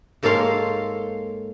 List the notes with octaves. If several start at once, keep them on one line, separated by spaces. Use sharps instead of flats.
G#2 A#3 A4 C#5 F5 C6